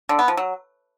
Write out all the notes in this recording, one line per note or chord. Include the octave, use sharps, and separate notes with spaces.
D3
B3
F3
F#3